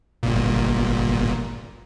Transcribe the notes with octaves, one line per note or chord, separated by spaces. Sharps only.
G1 A#2